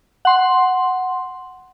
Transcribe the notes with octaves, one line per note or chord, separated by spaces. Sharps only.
F#5 C6